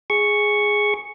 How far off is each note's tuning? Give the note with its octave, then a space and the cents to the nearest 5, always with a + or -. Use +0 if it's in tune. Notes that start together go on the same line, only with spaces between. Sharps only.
G#4 +0 C#6 +0